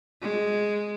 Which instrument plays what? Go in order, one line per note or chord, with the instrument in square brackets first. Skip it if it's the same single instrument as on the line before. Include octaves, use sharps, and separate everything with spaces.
[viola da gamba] G#3